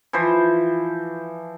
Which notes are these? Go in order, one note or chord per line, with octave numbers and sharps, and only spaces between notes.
E3 F3 C5